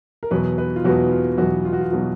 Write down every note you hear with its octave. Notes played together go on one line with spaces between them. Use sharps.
A#4
E2 B2 F#3 B3 B4
B4
F4
E2 B2 F#3 B3 F#4
F4
E2 B2 F#3 B3 F#4
F4
F#4
F4
B2 F#3 B3 F#4